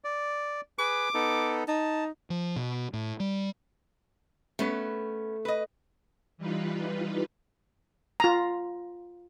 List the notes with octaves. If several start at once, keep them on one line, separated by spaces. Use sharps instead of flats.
D5
G#4 B4 D6
B3 D#4 A4
D#4 A5
F3
B2
A2
G3
A3 B3 C#4 B4
B4 D#5
E3 G3 D#4 F4 B4
F4 A#5